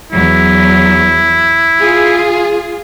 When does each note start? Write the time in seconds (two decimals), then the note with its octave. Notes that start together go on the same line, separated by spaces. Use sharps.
0.12 E2 F#3 E4
1.79 F4 G#4